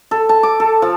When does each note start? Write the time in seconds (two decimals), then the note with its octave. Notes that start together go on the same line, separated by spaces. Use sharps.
0.11 A4
0.29 A5
0.43 D6
0.60 A4
0.82 F3